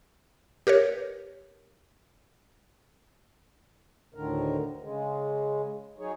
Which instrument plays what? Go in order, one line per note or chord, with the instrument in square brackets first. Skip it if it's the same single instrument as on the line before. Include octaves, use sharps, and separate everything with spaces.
[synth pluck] G4 A#4 B4 C#5
[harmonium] D2 A2 D3 D#3 A#4
C#3 G#3
F#3 D#4 G#4 C#5